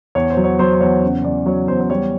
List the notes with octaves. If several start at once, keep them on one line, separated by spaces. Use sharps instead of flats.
E2 C#5
C5
F#3
C#5
F#3 C5
C5
E2 C#5
C#3
E2 D5
F#3 C#5
E2 C5
C5
G3 C#5